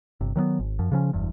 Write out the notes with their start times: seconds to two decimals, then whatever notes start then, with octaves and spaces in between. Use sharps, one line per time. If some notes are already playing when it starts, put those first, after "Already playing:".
0.21 G1 C3
0.36 D#3 F#3 G3 B3
0.59 G#1
0.79 F#2 F3
0.92 C#3 F3 C#4
1.13 F#1 E2 G2